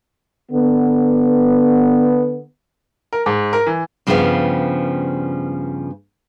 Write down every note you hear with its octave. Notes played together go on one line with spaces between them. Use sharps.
D3 B3
A#4
G#2
A#4
E3
G2 C#3 F3 G3 B3 F5